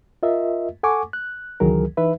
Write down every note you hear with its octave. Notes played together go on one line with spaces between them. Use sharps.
F4 A#4 D#5 E5
A4 F#5 G#5 C#6 D6
F#6
C#2 D#3 E3 F#3 G#4 A#4
E3 D#4 B4 E5